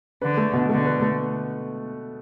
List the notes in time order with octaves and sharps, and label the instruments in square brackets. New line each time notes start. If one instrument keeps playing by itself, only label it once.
[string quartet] D3 [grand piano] B4
[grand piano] A3
B2
[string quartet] D3 [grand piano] A3
[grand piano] B4
A3